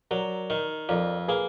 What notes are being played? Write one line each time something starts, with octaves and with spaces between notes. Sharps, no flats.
F#3 A#4 D5
D#3
F2 A#4 D5
A#3 G#4 B4